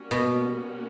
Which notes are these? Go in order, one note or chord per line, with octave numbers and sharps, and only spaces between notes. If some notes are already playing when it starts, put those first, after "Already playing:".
Already playing: G3 A#3 C#4 F#4
B2